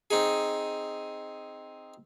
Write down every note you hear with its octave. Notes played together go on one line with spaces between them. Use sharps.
C4 D#4 G#4